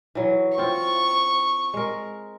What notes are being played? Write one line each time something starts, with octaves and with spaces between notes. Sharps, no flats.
E3 F#3
C4 F4 C#6
G#3 A#4